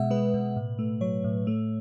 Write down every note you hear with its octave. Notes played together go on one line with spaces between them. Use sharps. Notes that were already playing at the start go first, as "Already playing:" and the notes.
Already playing: B2 G#3 E5 F#5
G#3 B4
B2
A2
A3
F#3 C#5
A2
A3